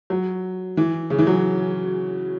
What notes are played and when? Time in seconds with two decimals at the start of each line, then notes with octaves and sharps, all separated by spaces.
0.10 F#3
0.77 E3
1.10 C#3
1.19 E3
1.27 F#3